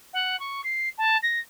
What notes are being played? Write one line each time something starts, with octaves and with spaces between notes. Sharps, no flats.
F#5
C#6
C7
A5
A#6